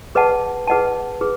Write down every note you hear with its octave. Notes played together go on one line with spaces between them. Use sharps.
G#4 B4 D#5 F#5 A5
G#4 B4 D#5 F#5 A5
G#4 B4